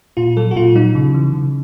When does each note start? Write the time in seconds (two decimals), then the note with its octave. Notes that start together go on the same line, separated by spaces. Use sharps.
0.17 A#2 F4
0.37 F#3 A4
0.51 F#4
0.56 A#2 F4
0.75 F#3 D#4
0.95 C#3
1.14 E3
1.33 C#3